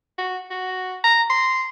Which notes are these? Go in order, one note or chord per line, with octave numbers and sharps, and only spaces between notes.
F#4
F#4
A#5
C6